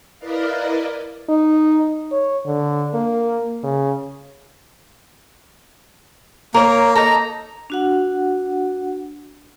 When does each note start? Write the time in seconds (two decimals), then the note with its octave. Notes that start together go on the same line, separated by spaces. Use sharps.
0.19 E4 A#4 B4 D5 D#5 F5
1.29 D#4
2.12 C#5
2.46 D3
2.94 A#3
3.63 C#3
6.54 A#3 A#4 C#5
6.96 D#4 A4 A#5
7.70 D4 F#4 F#5